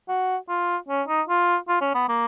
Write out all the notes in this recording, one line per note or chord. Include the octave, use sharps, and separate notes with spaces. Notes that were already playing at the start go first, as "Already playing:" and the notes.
F#4
F4
C#4
D#4
F4
F4
C#4
B3
A#3